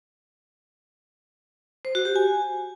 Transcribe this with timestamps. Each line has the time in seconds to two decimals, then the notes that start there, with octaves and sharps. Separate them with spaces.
1.85 C5
1.95 F#4
2.05 G4
2.16 G#5